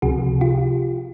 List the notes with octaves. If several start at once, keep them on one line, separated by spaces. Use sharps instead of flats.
C#2 C3 F3 F#4 G#4
F4 G4